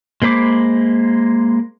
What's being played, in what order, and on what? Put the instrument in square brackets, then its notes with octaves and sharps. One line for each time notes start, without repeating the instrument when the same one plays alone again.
[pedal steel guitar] G#3 A#3 C5 B5 D6